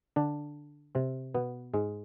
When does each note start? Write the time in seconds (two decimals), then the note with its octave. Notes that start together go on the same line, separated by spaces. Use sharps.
0.16 D3 D4
0.95 C3 C4
1.34 B2 B3
1.74 G#2 G#3